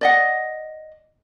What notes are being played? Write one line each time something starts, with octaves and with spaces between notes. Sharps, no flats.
D5 D#5 F#5